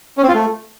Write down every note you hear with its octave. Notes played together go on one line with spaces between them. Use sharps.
C#4
C4
F4
A3